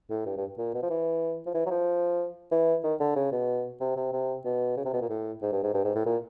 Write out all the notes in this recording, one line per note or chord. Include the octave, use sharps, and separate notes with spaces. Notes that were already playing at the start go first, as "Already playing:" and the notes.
A2
G2
G2
A#2
B2
F3
E3
F3
E3
F#3
F3
E3
D#3
D3
C#3
B2
C3
C3
C3
B2
C#3
C3
B2
A#2
A2
G#2
G2
G#2
G2
G#2
A2
A#2